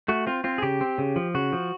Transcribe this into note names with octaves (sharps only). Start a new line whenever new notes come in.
A3 F#4
C4 F4
C4 F4
G#4
C#3 G4
C4
C#3
F3
C#3 F#4
F3